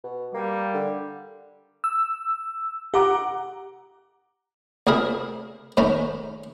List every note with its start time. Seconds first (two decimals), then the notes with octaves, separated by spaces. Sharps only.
0.04 B2
0.34 G3 A#3
0.74 D3
1.84 E6
2.94 G4 F#5 A#5 D6
4.87 C#2 A3 C4 G#4 A#4 B5
5.77 G#2 D#3 A3 C#4 A#5 B5